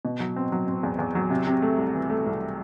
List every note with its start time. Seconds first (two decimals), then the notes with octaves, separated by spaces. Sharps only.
0.05 B2
0.20 F#3
0.36 C4
0.52 F#3
0.68 C4
0.83 E2
0.99 E2
1.15 F#3
1.30 C3
1.47 C3
1.62 A3
1.78 C2
1.94 E3
2.10 A3
2.26 C2